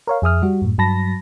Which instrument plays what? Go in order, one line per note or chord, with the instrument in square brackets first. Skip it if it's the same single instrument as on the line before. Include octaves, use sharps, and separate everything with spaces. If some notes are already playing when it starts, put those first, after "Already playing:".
[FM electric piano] A#4 C#5 F5
F2 G#4 E5 D#6 F6
G3 F#4
F#2 A2
G2 F#3 A5 B5 A#6